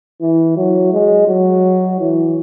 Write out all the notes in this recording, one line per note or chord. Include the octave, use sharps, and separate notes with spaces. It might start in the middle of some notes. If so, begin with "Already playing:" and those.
E3
F#3
G#3
F#3
E3